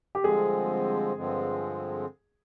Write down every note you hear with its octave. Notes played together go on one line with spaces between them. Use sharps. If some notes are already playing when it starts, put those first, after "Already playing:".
G4
G2 D3 F3 G#3 C4 G#4
G2 D3 F3 G#3 C4